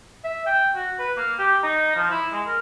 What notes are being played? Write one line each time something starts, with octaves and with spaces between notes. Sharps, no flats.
E5
G5
F#4
B4
A#3
G4
D#4
F3
E4
G#3
A#4